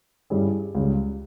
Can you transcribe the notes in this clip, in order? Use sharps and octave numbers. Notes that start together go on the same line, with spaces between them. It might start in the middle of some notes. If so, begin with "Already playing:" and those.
G2 G3 C#4 E4 G#4
C#2 C#3 G3